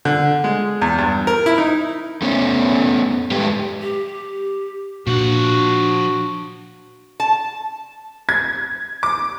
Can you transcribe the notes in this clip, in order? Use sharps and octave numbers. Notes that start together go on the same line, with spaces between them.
D3
G#3
E2
G2
A#4
E4
D#4
A3 B3 C#4
G#3 A3 G4 B4 G5
G4
A#2 F3 D4 F#4 F#5
A5
G#6
D6